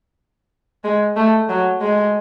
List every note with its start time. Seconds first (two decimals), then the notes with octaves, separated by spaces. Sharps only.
0.84 G#3
1.17 A3
1.49 F#3
1.81 G#3